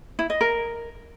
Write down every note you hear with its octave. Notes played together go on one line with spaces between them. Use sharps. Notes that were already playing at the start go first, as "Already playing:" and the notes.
E4
D#5
A#4